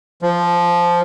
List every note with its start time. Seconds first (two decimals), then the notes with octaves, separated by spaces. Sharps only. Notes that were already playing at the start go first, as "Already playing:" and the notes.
0.22 F3